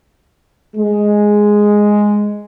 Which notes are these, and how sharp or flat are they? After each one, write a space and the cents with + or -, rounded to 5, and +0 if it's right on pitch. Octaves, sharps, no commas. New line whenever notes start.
G#3 +0